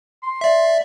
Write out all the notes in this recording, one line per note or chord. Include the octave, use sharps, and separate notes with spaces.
C6
D5 E5